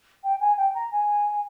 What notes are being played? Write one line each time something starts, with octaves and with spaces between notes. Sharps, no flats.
G5
G#5
G5
A#5
G#5